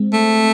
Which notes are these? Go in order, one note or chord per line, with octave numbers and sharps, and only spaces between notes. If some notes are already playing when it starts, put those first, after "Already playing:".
Already playing: G#3 C4
A3